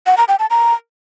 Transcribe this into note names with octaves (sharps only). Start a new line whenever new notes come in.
F#5
A#5
G5
A5
A#5